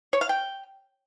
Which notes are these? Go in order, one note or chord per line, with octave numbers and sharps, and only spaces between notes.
C#5
F5
G5